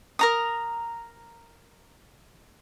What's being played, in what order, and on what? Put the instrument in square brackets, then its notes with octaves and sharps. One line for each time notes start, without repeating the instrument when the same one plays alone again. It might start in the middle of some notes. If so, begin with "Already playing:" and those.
[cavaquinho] A#4 A#5 D#6